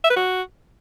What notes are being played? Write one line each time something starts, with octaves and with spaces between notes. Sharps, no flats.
E5
B4
F#4